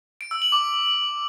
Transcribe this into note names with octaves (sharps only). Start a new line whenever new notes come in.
D7
E6
F#7
D6